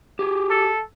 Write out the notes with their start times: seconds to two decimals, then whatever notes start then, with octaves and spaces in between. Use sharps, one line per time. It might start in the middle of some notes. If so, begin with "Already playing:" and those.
0.19 G4 G#4
0.50 A4